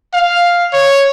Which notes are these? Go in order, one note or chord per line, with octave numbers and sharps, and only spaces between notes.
F5
C#5